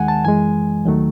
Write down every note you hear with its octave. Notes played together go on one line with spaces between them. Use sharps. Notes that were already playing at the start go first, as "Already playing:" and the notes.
Already playing: D#2 D#3 G#3 F#5 G#5
A5
F#2 E3 G#3 G#5
D#2 D#3 F#3 A3